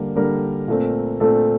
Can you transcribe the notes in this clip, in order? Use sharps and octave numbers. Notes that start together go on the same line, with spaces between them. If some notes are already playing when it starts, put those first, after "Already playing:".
Already playing: D3 G3 A#3 A#4
D3 G3 A#3 A#4
A#2 A3 C4
A#2 A3 C4 A4